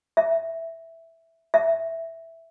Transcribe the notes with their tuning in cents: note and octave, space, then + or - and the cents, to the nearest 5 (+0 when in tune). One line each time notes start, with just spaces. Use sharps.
E5 +0
E5 +0